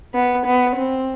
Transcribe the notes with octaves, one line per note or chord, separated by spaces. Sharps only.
B3
B3
C4